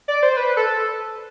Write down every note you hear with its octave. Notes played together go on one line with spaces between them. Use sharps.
D5
C5
B4
A4